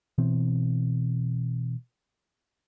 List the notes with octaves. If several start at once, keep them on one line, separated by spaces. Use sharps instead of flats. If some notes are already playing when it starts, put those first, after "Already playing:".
B2 E3 C4